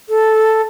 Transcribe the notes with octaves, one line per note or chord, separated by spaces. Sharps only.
A4